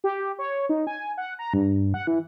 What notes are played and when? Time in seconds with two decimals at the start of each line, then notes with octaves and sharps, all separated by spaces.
0.04 G4
0.39 C#5
0.69 D#4
0.87 G#5
1.18 F#5
1.39 A#5
1.54 G2
1.94 F#5
2.07 E3